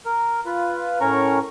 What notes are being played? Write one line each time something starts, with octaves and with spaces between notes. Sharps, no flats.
A#4
F4 B4
A2 C#4 A#4 A#5 C#6